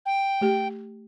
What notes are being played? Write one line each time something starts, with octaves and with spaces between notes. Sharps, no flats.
G5
A3 G4